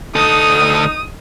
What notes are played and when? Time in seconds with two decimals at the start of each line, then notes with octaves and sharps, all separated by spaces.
0.16 D2 D#4 A4 D#6